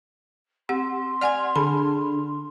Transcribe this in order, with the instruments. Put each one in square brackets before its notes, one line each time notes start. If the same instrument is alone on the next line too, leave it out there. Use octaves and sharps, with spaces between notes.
[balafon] C4 G4 F#5 [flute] C6
[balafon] D5 F#5 G#5 [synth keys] F6 G#6
[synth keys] D3 [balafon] G#4 B5